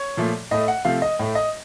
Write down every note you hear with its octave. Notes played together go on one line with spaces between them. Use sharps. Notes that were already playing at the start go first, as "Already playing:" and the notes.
Already playing: C#5
A#2 F3 A3
A2 A3 D#5
F#5
C3 F3 A3 F5
D#5
A2 A3
D#5